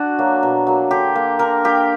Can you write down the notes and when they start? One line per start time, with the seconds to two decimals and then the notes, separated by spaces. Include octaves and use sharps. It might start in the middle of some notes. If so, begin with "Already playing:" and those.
Already playing: D4 F#4
0.19 F#3 A#3
0.43 B2
0.67 F#3 A#3
0.91 D3 G4
1.15 A#3
1.39 D3 A#4
1.64 A#3 G4